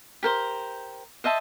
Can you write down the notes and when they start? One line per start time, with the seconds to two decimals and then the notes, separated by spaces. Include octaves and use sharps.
0.23 G4 A#4 C5
1.24 C5 D#5 E5 A5